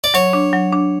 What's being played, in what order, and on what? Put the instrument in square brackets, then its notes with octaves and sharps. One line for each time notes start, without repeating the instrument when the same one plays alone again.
[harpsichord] D5
[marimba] F#3 [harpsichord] C#5
[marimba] D4
F#3
D4